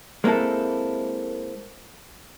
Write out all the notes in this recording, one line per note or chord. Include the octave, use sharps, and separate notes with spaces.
G#3 A#3 C4 E4 A4